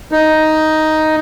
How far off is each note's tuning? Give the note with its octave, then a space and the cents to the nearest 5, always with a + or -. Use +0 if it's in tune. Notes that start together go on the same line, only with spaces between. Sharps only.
D#4 +5